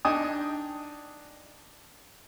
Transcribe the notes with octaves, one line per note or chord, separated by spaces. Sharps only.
D4 D#4 D#5 G5 G#5 D#6